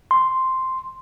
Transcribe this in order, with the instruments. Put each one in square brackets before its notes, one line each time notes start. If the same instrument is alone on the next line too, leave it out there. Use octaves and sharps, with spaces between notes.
[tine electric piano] C6